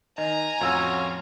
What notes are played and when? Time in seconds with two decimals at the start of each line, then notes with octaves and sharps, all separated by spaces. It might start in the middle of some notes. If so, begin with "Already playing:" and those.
0.18 D#3 D#5 G#5 A#5
0.61 F2 A2 F3 C#4 F4 F#4 E6 G#6